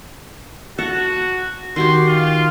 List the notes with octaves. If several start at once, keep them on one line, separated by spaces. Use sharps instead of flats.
F#4 F#5 A5 C#6
D#3 F#4 G4 C6
F4